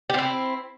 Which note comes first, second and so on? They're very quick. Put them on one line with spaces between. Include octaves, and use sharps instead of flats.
G4 C4 E4